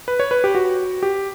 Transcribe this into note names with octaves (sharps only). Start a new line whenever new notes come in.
B4
C#5
B4
G4
F#4
G4